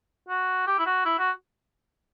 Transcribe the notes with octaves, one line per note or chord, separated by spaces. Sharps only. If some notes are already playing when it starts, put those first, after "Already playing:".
F#4
G4
E4
F#4
E4
F#4